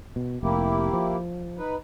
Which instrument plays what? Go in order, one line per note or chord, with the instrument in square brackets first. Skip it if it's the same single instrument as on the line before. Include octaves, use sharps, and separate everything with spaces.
[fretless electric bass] B2
[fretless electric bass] F1 [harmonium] A#3 E4 G4
[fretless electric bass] F3
[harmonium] D#4 B4